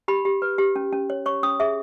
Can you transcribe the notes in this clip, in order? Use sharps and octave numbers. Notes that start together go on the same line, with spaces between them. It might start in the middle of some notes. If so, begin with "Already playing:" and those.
G4 B5
G4
B4
G4
C#4
C#4
C#5
C#5 C#6
C#4 D#6
G#4 E5